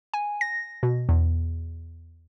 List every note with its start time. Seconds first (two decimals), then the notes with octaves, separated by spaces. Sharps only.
0.14 G#5
0.41 A#6
0.83 B2
1.09 E2